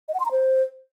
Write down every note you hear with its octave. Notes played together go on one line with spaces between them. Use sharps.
D#5
F#5
C6
A#5
C5